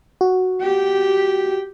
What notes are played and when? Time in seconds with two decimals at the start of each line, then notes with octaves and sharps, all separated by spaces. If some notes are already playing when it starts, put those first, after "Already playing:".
0.21 F#4
0.62 G4 G5